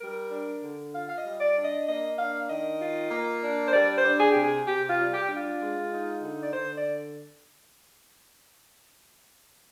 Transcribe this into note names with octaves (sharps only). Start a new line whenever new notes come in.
G3 A#4
D4
D3
F4 F5
F5
D#5
G3
D5
D4
D#5
A#3 D#5
D4 F5
D#3 D#5
F4
A#3
D4
C5
G3 D5
C5
D4
G#4
C3 G4
G#4
C3 G4
F4
G3
G4
D4
F4
G#3
D#4
D3
D5
D3 C5
D5